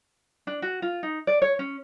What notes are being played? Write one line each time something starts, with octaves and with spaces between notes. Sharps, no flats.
D4
F#4
F4
D#4
D5
C#5
C#4